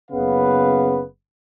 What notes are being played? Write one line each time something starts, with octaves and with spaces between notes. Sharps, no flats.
F#1 C#3 B3 B4 F5